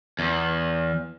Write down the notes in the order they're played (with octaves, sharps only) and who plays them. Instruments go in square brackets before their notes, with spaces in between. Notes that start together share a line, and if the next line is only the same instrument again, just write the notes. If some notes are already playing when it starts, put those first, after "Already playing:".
[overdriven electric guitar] E2